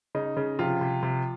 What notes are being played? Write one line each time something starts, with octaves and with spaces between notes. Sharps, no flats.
C#3 D#4
C#3
C3 F3 F4
C3
C3